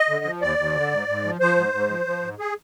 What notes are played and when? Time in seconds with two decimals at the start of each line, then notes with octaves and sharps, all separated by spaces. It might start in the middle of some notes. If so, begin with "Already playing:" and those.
Already playing: D#5
0.09 D3
0.25 F3
0.41 D#2 D5
0.58 D#2
0.75 D3
0.91 G#2
1.08 G#2
1.25 F3
1.40 F3 C5
1.56 G#2
1.73 G#2
1.90 F3
2.06 F3
2.22 G#2
2.39 G#4